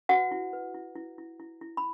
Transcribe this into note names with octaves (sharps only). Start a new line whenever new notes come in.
F#4 B4 F#5
E4
B4
E4
E4
E4
E4
E4
B5